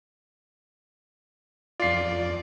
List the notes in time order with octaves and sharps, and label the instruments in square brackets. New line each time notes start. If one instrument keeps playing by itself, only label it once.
[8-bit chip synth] F2 D5 [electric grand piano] F4 C7